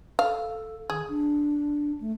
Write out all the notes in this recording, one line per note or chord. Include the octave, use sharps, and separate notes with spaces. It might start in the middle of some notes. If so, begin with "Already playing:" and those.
A4 F5
D#3 G#4
D4
A3